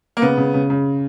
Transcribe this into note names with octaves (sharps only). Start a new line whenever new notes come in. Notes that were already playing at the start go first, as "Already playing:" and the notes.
A#3
C#3 B3
C#3
C#3
C#3